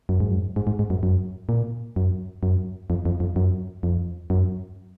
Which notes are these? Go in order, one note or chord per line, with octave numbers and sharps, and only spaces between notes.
F#2
G#2
F#2
G#2
G#2
G#2
F#2
F#2
A#2
F#2
F#2
F2
F2
F2
F#2
F2
F#2